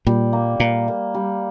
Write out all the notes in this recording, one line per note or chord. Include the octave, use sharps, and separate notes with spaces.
A#2 G3
A#3
A#2 A#3
A#3
G3